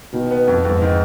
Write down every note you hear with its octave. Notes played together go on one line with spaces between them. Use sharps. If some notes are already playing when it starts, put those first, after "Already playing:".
B2 D#3
B3
F2
F2 G#2
D#3